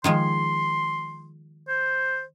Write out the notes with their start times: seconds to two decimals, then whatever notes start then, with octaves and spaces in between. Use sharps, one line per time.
0.04 D#3 F3 G#3 C6
1.68 C5